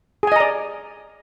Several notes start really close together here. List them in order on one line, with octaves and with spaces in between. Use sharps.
G#4 G#5 D#5 A#5 D5